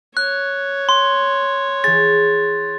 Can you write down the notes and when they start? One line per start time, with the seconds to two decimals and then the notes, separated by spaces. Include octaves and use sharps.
0.17 C#5 F#6
0.89 C6
1.84 E3 G#4 A6